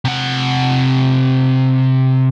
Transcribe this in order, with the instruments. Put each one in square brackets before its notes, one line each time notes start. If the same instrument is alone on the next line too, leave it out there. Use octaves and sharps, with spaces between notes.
[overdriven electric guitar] C3 F#5